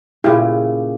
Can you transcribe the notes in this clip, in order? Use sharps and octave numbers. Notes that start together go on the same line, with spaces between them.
A#2 C#3 E4 G4